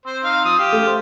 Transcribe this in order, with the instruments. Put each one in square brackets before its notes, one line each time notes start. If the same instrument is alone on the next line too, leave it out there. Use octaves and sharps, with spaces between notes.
[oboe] C4 [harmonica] C5
[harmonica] D#4 F5
F3 D#6
[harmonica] G4 [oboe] F5
[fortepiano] A3
[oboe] C5